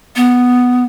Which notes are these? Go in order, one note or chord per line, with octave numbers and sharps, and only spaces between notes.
B3